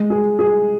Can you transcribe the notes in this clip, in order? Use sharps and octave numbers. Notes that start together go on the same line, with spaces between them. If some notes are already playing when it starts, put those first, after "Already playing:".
Already playing: G#3
G#4
G#4